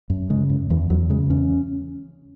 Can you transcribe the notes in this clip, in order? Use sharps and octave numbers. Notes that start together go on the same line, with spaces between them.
F#2
C#3 G#3
F#2
E2 E3
E2 F#3
C#3 G#3
E2 C#4